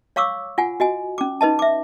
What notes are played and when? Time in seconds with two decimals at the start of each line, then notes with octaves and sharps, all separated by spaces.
0.16 C#5 F5 C#6 D6 E6
0.58 F4 F#5 G#5
0.80 F#4 D#5 G#5
1.18 C#4 D6
1.41 D#4 B4 D#5 A5
1.59 E5 D6